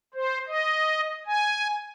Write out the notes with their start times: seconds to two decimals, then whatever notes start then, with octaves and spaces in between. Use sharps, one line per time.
0.14 C5
0.47 D#5
1.26 G#5